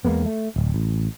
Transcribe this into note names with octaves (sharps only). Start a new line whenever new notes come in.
E2 G#3 A#3 B3
A3
D1
A1